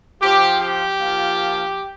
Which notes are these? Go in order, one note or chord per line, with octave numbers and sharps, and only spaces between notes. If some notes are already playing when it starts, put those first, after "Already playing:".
F3 C4 F4 G4
G4
F3 A#3 F4